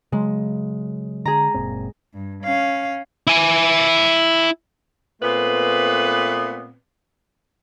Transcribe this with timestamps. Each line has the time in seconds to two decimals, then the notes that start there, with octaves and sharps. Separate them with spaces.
0.12 C#3 F#3 G#3
1.26 D3 G#4 A#5
1.54 F#1 A#2 C4
2.14 G2
2.44 C#4 F5
3.27 E4 G#5
5.22 A#2 A3 B3 C4 B4